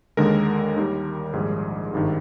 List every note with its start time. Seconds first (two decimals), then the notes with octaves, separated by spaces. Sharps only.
0.17 D#2 D3 G#3 A#4
0.76 D#2 D#3 G3
1.33 A#1 G#2 D#3 G3 G#4
1.93 G#1 G2 D#3